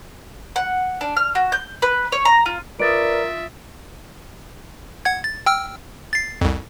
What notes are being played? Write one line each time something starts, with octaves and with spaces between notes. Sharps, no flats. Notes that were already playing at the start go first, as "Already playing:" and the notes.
F#5
D4
F6
F#4
G6
B4
C#5
A#5
F4
F4 A#4 B4 D5 E5 D#6 A6 D7
F#5 G#6
A6
G5 E6 F6
A6 C7
C2 F2